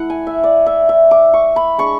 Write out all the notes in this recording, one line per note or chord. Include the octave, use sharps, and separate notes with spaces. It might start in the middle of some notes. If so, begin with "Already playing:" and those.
Already playing: A3 E4 F#5
G#5
E5
D5
E5
E5
D6
C#6
B5
G#3 D4 C#6